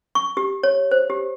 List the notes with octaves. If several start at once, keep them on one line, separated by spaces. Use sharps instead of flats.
C#6
G4
C#5
C5
G4